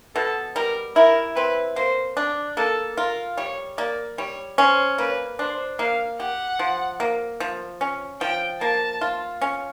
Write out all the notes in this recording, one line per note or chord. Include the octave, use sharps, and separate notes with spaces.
B2 A4
G3 A#4
E4 A#4
C4 B4
A#3 C5
D4
A#3 A4
F4 A#4
G3 C#5
A#3 D5
G3 C#5
C#4 C5
A#3 B4
D4 C5
A#3 F5
G4 F#5
F3
A#3
F3
C#4
F3 G5
A#3 A5
F4
C#4